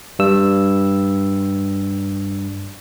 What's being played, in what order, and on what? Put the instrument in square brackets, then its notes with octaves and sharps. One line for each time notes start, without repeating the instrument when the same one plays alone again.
[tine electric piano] G2 E6